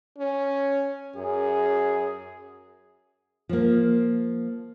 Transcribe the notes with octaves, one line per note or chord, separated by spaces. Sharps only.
C#4
F#2 G#4
F3 A#3